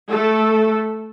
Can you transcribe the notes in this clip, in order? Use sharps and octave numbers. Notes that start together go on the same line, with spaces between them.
A3 A4